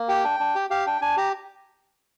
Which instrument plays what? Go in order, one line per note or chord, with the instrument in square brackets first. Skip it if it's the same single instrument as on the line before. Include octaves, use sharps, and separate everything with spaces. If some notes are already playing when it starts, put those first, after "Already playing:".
Already playing: [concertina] A#3
G4 G5
D4
D4
G4
G4 F5
D4 G5
D4 G#5
G4 A#5